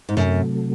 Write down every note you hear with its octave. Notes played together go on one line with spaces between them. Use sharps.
G#2
F#2 C3 F#3 A3